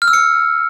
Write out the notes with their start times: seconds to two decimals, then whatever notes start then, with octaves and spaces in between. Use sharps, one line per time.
0.02 F6
0.08 E6
0.13 C#7